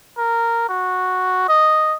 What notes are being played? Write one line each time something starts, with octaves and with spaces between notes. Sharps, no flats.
A#4
F#4
D#5